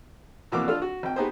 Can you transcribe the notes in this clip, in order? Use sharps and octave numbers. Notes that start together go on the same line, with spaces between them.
F2 B2 E3 A#3 D6 E6
D4 F4 A4 F6
F#4
G#1 G5
B3 D#4 G4 G#4 C5